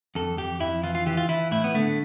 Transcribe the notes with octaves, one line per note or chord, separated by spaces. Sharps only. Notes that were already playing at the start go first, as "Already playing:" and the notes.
F2 A4
F2 G4
F2 E4
E3 F4
F4
E3 G4
F4
E3 E4
A2 E4
B3
D3 A3